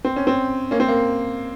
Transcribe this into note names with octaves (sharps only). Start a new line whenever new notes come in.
C4
C#4
C4
A#3 C#4
C4
A#3